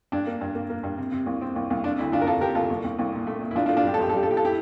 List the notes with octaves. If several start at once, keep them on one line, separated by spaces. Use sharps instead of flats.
G2 D4
A#3
G2
A#3
A#3
G2
C3
C3
C2
C4
C2
C2
C3 D4
D2 E4
D2 D4 F4
A#4
C3 F4 A4
C3 G4 A#4
D2 F4 A4
C2
C2
C2
A#2
A3
A#2
E4
A#1 D4 F4
D4 F4
A2
D4 F4
G3 G4
A4
A#1 G4
A4
G3 G4
A4
A2 G4
A4
E4 G4